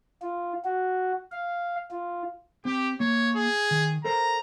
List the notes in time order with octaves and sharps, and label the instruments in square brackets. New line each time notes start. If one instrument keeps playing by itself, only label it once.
[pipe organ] F4
F#4
F5
F4
[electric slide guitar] C4 [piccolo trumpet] G4
[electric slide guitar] A#3 [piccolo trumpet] C#5
[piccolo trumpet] G#4
[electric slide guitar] D#3
[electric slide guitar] A4 A#4 C5 [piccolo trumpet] A#5